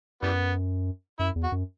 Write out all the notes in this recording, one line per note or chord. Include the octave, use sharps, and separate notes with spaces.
F#2 E3 G3 B3
F#2 E4
E2
F#4
F#2